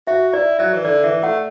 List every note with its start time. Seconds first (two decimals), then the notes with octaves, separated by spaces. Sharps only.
0.07 F#4 E5
0.33 E4 D5
0.59 F#3 E5
0.73 E3
0.85 D3 D5
1.04 E3 E5
1.23 A3 F#5